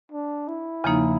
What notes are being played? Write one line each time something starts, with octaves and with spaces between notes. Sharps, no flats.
D4
E4
E2 C#3 F3 A#3 D#4